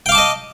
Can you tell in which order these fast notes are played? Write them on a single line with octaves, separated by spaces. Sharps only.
G5 F5 D6 A5 D#5